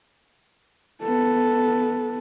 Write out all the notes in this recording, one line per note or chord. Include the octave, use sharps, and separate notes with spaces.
B3 A4